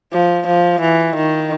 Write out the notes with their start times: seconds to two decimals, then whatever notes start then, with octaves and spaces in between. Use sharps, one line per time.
0.13 F3
0.47 F3
0.81 E3
1.16 D#3